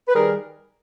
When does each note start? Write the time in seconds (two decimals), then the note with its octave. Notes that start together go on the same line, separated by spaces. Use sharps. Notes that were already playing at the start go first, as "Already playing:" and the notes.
0.08 B4
0.14 D#3 G3 G#4 A#4